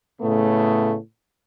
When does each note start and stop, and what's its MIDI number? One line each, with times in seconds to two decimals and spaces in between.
0.21 0.96 45
0.21 0.96 49
0.21 0.96 57
0.21 0.96 59